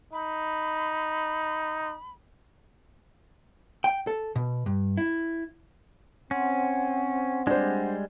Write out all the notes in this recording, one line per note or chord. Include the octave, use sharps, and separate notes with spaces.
D#4 B5
G5
A4
B2
G2
E4
C4 C#4 F#5 C6
G3 G#3 D4 C5